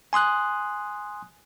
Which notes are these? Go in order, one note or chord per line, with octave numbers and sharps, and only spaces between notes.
G#5 C6 D#6 F#6